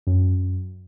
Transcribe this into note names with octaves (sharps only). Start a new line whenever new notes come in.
F#2